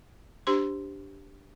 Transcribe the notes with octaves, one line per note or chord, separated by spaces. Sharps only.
D4 G4 C5 C6